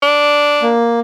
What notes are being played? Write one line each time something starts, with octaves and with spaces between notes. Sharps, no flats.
D4
A#3